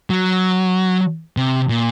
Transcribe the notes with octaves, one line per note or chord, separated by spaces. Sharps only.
F#3
C3
A#2